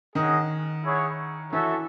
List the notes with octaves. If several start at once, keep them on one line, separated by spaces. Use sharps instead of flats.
D#3 C#4 G#4 D#5 F#5
E4 G#4 C#5 F#5
E3 F#4 A4 C#5 E5